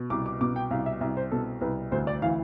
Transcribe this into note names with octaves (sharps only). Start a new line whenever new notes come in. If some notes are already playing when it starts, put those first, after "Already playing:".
Already playing: B2
C2 D6
D6
B2 D6
G5
C2 F5
E5
C2 E5
C5
B2 A4
C2 B4
D2 C5
D5
E3 F5